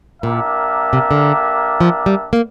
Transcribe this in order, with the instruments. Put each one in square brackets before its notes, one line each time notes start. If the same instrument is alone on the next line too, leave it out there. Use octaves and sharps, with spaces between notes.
[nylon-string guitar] A#2 [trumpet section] A#3 D4 G4 A#4 E5
[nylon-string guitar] C3
D3
F3
G3
A#3